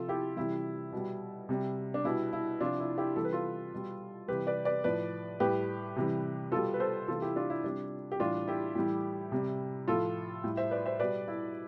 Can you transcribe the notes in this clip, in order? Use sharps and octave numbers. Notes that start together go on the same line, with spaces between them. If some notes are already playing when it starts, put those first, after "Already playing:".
Already playing: C3 F3 F4 A4
E4 G4
C3 E3 G3 E4
B2 G3
C3 G3
D4
B2 G3 E4
E4
C3 F3 D4 F4
E4
E4 G4
C3 E3 G3 A4
B4
F4 A4
B2 G3
C3 E3 G3 G4 B4
B4 D5
B4 D5
A2 F3 B4 D5
A2 G3 G4 B4
C3 E3 G3
B2 G3 F4 A4
B4
A4 C5
C3 E3 G3 F4 A4
E4 G4
D4 F4
E4
C3 G3 D4
G4
A2 E3 G3 D4 F4
E4 G4
A2 E3 G3
C3 G3
A2 F3 F4 A4
A2 G3
C5 E5
B4 D5
C5 E5
B2 G3 B4 D5
E4